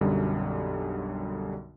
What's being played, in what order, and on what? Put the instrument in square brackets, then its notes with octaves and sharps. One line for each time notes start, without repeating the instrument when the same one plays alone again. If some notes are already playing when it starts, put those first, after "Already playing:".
[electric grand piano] B1 F#2 D3 G3